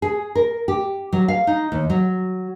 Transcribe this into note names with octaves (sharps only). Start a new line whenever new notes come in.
G#4
A#4
G4
F#3
F5
D#4
D#2
F#3